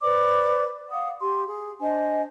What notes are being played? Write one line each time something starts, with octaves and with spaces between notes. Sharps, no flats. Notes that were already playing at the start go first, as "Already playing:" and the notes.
B4 C5 D5 D6
F5 F#5 D#6
G4 C6
G#4
D4 C5 D#5 G#5